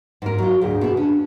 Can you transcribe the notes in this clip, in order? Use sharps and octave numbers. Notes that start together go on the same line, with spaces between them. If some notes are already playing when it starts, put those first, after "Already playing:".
G#2 A#4
F#3 F4 F#4
D2 G#2 G#4
B2 E4
C#4 D4